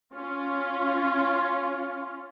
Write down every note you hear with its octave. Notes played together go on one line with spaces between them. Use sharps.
C#4 F4